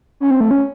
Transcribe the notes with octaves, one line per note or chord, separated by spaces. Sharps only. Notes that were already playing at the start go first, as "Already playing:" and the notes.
C#4
C4
A3
C#4